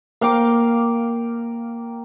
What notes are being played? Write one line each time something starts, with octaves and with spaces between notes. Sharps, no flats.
A#3 F5 G5 D6